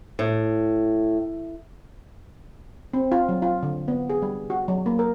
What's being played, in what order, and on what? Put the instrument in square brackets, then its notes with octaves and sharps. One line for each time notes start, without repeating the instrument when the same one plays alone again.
[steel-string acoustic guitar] A2
[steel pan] C4
F4
F#3
F4
D3
B3
G#4
G3
F#4
F#3
A#3
A#4